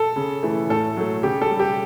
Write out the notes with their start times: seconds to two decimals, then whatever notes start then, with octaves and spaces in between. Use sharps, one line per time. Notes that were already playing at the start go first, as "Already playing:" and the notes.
Already playing: A4
0.16 C#3
0.43 E3 A3
0.70 A2 A4
0.97 F#3 A3
1.23 C#3 G4
1.41 A4
1.51 G3
1.59 G4